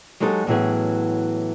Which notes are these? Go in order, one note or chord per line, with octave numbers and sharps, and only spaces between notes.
F#3 G#3 D#4 G4 A4
A2 E3 F#3 B3 C#4 G#4